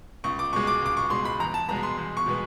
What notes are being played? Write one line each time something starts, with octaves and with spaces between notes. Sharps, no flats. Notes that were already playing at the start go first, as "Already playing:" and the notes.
C#2 C#6
D6
B2 G#3 C#6
D6
C#2 D6
C#6
B2 G#3 C6
B5
E2 A#5
A5
B2 G#3 B3 A#5
C6
E2
C#6
B2 G#3 B3